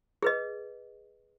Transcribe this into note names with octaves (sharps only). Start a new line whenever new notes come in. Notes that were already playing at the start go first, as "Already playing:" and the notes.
G#4 B4 D#5